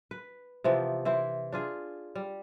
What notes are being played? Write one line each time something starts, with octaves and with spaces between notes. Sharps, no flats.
B4
C3 E3 F3 B3
E3 E4 C5
D4 F4 G#4
G3